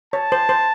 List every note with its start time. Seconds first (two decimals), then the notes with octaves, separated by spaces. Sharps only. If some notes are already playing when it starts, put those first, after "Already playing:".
0.13 C#5 A5
0.32 C5
0.49 C5